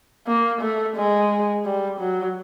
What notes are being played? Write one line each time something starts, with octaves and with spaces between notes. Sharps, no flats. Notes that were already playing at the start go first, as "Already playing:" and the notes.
A#3
A3
G#3
G3
F#3